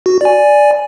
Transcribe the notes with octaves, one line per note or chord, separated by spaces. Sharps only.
F#4
D5 G#5